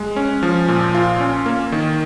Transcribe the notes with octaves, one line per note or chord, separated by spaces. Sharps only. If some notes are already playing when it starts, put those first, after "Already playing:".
Already playing: G#3
C#4
F3
A#2
F4
C#4
A#3
D#3